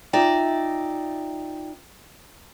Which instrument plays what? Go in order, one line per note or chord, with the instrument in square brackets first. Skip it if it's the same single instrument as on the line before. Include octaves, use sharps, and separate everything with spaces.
[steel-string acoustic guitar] D#4 D5 E5 [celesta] F4 G5